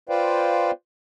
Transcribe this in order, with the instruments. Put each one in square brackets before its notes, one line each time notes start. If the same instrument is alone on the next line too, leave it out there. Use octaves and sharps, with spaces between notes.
[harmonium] F4 B4 C5 D5 F5 G5